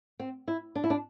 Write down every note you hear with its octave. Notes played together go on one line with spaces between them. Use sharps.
C4
E4
D4
E4
D4